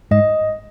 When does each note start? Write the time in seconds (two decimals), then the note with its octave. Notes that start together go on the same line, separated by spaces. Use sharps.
0.11 G#2 D#5